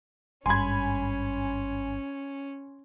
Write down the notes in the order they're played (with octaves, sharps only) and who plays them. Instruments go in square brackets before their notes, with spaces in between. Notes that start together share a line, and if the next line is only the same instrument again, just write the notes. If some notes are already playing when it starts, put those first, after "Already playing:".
[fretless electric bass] G#1 G2 [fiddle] C#4 [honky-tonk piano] G#5 B5 [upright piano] C6 G#6